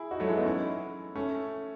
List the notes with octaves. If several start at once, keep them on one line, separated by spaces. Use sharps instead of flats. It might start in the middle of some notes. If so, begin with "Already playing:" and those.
Already playing: E4 G#4
D#4 F#4
F#3 A3
E3 G#3
B3 D#4
C#4 E4
A3 C#4